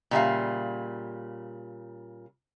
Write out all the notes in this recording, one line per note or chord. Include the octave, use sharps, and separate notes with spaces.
A#2 C#3 G3 E4 E5 F5